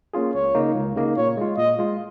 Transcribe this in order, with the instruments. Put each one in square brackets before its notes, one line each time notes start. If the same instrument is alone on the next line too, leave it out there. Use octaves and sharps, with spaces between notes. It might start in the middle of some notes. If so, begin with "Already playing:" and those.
[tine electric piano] A#3 C#4 F4 G#4
[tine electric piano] C#2 [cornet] C#5
[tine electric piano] C#3 A#3 D#4
C#2
C#3 A#3 D#4
[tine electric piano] A#2 [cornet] C#5
[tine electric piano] G#3 F4
[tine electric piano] A#2 [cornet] D#5
[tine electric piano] G#3 F4